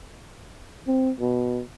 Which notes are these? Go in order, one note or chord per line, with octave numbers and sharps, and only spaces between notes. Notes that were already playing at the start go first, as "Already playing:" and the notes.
C4
B2